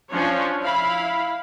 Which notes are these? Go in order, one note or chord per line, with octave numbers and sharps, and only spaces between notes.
F3 C#4 D4 C#5
E4 F5 B5